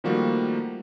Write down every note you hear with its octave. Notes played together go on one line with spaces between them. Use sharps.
D#3 F3 G3 A3 A#3 F#4